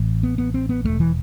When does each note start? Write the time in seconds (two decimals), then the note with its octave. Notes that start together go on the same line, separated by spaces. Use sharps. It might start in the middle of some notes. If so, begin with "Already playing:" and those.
Already playing: A1 A2
0.23 B3
0.38 B3
0.54 C4
0.69 B3
0.84 E1 D#2 A3
1.00 E3